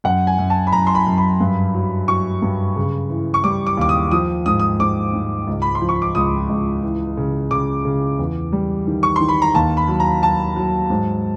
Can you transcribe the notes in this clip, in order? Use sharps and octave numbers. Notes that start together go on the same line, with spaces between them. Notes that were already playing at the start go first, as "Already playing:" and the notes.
F#2 F#5
G#5
F#2
A5
B5
F#2 A#5
C6
B5
F#2
B5
G2
F#3
F#3 C#6
G2
C#3
E3
C#6
G3 D6
D6
D#2 D6
D#6
F3 D#6
G#2 D#6
D#6
G#2 D6
G#2
C#2
B5
C6
F3
C#6
D6
C#2 D#6
C#2
E3
C#3
C#3 D6
C#3
E2
G3
D#3
C#6
D#3 C6
B5
A#5
D#2 A5
B5
F#3
A#5
F#3 A5
F#3
G#2